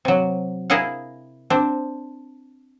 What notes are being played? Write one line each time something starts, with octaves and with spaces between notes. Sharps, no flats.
C3 F#3
E4 G#4 A#4 D#5 F5 F#5
C4 D4